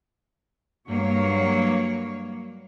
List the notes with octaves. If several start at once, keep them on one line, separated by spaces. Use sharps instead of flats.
G2 F#3 A#3 C#5